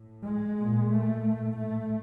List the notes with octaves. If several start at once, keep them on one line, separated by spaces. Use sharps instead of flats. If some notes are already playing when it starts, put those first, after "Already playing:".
Already playing: A2
G#3
A#2
A3
A2
A3